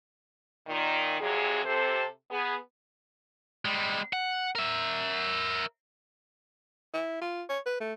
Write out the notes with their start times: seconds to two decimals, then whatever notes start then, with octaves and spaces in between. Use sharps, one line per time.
0.66 A#2 D#3
1.20 F2 C3 F#3 G#4
1.64 C3 A4 C5
2.30 B3 G#4
3.65 G3 G#3
4.13 F#5
4.55 A#4 E5
6.94 E4
7.21 F4
7.49 C#5
7.66 B4
7.80 A3